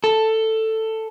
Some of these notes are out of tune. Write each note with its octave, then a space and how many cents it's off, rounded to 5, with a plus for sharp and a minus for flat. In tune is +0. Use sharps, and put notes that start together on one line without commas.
A4 +10